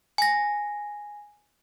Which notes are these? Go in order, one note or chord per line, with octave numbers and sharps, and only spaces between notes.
G#5 A#6